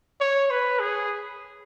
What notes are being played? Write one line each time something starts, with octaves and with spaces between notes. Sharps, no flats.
C#5
B4
G#4